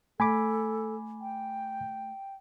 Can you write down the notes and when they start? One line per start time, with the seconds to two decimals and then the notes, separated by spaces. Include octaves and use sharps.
0.20 A3 A4 G#5 B5 D6
1.21 G5